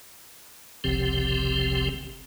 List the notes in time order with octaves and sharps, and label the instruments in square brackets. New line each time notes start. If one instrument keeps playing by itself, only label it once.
[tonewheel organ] F#1 C2 C3 F3 C4 G4